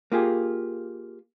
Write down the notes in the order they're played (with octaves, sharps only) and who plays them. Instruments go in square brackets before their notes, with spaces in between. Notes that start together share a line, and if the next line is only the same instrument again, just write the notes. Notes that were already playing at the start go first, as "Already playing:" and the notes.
[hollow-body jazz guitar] A#3 F4 G4 G#4